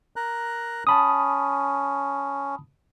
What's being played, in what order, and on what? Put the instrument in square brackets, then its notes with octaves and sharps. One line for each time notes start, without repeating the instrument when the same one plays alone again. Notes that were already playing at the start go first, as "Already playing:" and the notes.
[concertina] A#4 A#5 F#6
[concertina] C#4 [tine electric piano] A5 B5 D#6